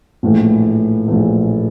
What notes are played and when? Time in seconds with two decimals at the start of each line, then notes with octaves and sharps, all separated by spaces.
0.23 A#1 A2 E3 A3
1.08 A#1 A2 E3 A3